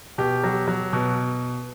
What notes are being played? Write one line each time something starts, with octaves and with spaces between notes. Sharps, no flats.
B2 G4
F#3
F#3
B2